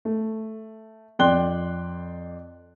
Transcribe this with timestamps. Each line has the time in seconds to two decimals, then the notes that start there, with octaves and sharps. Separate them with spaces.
0.05 A3
1.19 F2 D5 G5 C6 F#6 G7